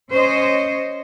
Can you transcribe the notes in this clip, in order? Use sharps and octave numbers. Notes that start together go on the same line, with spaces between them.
C#4 C5 C#5 D#5